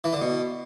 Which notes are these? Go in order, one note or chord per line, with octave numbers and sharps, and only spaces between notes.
E3
D3
B2